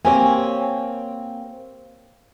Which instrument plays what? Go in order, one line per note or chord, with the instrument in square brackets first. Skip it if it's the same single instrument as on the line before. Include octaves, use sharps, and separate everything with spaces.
[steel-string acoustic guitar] A#3 C4 C#5 [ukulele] G4 G#5